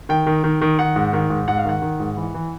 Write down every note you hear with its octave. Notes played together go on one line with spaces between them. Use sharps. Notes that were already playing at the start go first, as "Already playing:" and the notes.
D#3 G5
D#3
D#3
D#3
D#3 F#5
G#2
D#3
G#2
G#2 F#5
F5
D#3 F#5
D#3
G#2
E3
E3